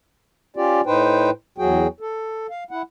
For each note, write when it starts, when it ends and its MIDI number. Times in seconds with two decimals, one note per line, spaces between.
0.56 0.81 61
0.56 0.81 65
0.56 0.81 67
0.56 0.81 74
0.86 1.30 45
0.86 1.30 63
0.86 1.30 71
0.86 1.30 72
0.86 1.30 79
1.58 1.87 40
1.58 1.87 54
1.58 1.87 66
1.58 1.87 68
1.58 1.87 79
2.00 2.47 69
2.50 2.64 77
2.71 2.82 64
2.71 2.82 78